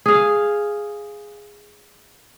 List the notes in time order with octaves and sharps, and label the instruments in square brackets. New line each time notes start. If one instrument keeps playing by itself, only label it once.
[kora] G#4 F5